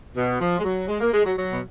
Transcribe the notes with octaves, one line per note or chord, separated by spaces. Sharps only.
B2
F3
G#3
F#3
G#3
A#3
G#3
F#3
F#3
B2